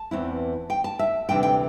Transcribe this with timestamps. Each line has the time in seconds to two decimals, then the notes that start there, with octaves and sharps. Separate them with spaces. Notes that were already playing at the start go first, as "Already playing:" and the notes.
Already playing: A5
0.11 E2 E3 C4 E4
0.70 G5
0.84 A5
0.99 E5
1.29 D2 C3 E3 G3 D4 G5
1.43 G5